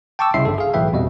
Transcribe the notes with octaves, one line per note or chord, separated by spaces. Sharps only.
G5 A5 C#6 D6 E6
C2 C#3 E4 E5 C6 C7
G1 G2 A4
G#4 F5
B1 A2 E3 B4 E5 G5
A1 F2 B2 G3 D#5